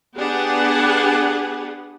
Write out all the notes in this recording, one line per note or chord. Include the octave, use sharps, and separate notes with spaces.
B3 D4 G4 G#4 B4 F#5